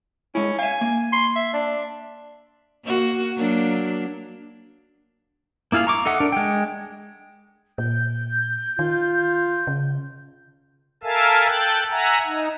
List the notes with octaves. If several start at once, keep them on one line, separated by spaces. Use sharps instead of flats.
G#3 C#4 E4
E5 F5 G#5
A#3
C6
E5
D4
A#3 F#4
F#3 A#3 D4
A#3 E4 F4 G#4 F5
A#5 C#6 D6
D#4 A4 E5 F#5
D4 A#4
G#3 G5
A#2 G6
D#3 F4
C#3
A4 A#4 E5 F5 G#5 A5
A4 G5 F#6 A6
E5 F#5 G#5 A#5
D#4